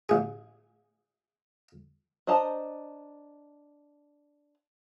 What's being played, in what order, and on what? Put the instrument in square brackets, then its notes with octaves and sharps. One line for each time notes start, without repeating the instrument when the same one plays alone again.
[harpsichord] A1 G#4
[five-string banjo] D4 C5 D#5 A5 A#5